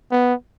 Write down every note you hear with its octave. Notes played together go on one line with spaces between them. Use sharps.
B3